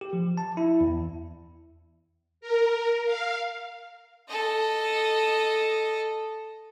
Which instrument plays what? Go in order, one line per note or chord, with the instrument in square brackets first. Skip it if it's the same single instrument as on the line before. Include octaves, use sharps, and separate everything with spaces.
[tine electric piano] G4
F3
A5
E4
E2
[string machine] A#4
F5
[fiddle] A4 D#5